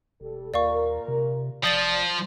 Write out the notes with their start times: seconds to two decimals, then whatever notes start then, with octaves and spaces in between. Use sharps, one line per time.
0.21 E1 G3 A4
0.54 D#2 A#2 A#4 D5 F5 C#6
1.08 C3
1.64 F1 F3 D5 D#6 A6 F#7